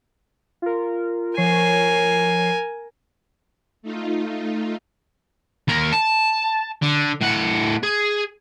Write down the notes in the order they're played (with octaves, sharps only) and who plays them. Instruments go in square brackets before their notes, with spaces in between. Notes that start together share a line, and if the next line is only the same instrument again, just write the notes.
[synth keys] F4 A#4
[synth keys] F3 C#5 C7 [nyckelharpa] A#4 G#5
[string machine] A3 D#4 F4
[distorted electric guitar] D#2 A#4
A5
D3
A2 F#5
G#4